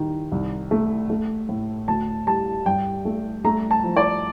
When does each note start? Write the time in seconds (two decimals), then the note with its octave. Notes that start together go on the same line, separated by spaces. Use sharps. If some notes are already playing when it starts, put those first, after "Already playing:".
Already playing: D#3 G3
0.32 C2
0.71 A3
1.10 A3
1.49 A2
1.88 D2 A5
2.27 G3 A5
2.66 G2 G5
3.05 A3
3.44 A3 A#5
3.71 A5
3.84 F3
3.96 D5